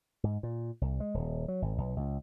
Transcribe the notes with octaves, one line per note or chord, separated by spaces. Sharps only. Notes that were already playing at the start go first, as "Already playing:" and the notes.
G#2
A#2
C2
G#3
D#1
F#3
G#1
B1
C#2